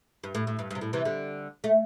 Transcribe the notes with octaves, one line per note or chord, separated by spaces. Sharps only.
G2
A2
A2
G2
G2
C3
A2
C3 E3
D3 G3
A3